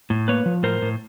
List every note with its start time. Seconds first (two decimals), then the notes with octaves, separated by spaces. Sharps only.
0.10 A2
0.28 A#3 B4 C#5
0.46 F3
0.63 A2 A#4 C5
0.82 A2